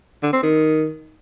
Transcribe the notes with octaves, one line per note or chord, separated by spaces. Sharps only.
D3
C4
D#3